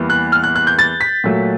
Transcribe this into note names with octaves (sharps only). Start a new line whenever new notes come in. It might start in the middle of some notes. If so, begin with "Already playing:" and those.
Already playing: E2 E3 G3 A#3
F#6
F6
F#6
F#6
G6
A6
B6
A#2 F#3 A3